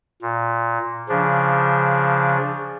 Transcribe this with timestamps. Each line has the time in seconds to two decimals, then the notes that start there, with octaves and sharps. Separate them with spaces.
0.22 A#2
1.09 C#3 F3 D4